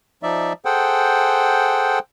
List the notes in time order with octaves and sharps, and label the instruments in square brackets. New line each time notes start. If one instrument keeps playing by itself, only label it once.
[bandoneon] F3 D#4 D5 E5
G#4 A4 C5 F#5 G5